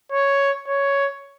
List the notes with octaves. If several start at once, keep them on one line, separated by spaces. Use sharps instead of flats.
C#5
C#5